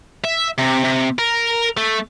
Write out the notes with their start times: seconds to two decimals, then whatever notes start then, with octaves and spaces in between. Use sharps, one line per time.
0.24 E5
0.58 C3
0.84 C3
1.18 A#4
1.77 A3